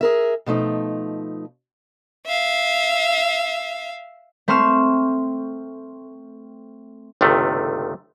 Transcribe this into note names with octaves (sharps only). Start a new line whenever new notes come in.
G#4 A#4 E5
B2 F3 A3 D#4
E5 F5
A3 C4 C6 C#6 F6 E7
G1 C#2 C3 D#3 A3